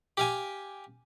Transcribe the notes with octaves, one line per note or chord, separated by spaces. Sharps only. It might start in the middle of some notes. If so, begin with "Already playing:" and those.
G4 F5 G#5